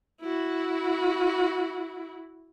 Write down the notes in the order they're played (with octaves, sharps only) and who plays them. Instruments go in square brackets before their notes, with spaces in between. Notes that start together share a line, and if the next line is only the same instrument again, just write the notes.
[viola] E4 F#4